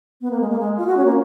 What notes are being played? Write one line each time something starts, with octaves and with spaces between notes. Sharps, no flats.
B3
A#3
G#3
A#3
G#3
F4
F#4
C#4
A#3